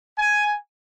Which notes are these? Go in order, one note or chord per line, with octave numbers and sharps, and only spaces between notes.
G#5